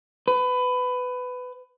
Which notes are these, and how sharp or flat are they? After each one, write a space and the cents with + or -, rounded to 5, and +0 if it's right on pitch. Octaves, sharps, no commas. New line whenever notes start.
B4 +20